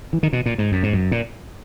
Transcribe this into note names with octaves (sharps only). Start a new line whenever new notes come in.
E3
D#3
B2
A#2
G#2
F#2
G#2
F#2
A#2